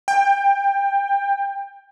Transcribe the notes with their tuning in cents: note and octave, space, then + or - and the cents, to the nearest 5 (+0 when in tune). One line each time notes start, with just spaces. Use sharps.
G5 +20